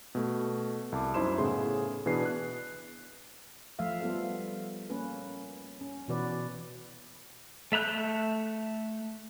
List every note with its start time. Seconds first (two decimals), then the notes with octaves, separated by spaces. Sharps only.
0.15 B2 A3
0.92 C2 A5 D6
1.14 F#2 D#4 E4 C5 C6 E7
1.38 A2 C#3 B3 G#4 C6
2.06 B2 E3 D4 G#4 B4 C7
2.25 F#6
3.79 F3 A3 E5 F5
4.01 G3 B3 F4 A4 F5
4.90 A#3 C#4 B4
5.81 C#4
6.08 B2 E3 F#4 B4 D5
7.72 A3 E5 A#5 F#6 G6